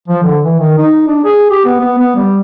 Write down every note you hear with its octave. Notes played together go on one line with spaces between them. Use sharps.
F3
D3
E3
D#3
D#4
D4
G#4
G4
B3
B3
B3
G3